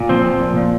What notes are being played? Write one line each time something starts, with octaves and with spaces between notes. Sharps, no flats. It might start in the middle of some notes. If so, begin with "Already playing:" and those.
Already playing: A#2
F3 C4
F3
A#2
A#2